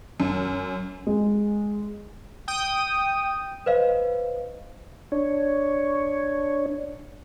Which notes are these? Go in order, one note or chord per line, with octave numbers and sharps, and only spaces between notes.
F#2
G#3
G5 D#6
B4 C5 D#5 F5
D4 C#5